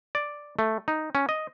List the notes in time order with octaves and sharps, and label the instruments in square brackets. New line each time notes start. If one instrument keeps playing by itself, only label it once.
[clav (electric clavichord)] D5
A3
D#4
C#4
D#5